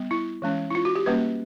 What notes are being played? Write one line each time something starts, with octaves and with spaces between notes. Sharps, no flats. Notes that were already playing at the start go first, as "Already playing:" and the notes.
Already playing: G3 B3
E4
E3 G#3 C#4
E4
F4
F#4
G4
G3 A#3 C#4 B4